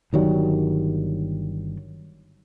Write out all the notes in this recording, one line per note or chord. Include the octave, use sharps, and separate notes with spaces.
G1 D#3 F#3 G3